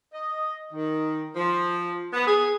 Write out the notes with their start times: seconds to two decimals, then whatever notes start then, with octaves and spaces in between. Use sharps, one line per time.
0.13 D#5
0.73 D#3
1.36 F3
2.13 B3
2.27 G#4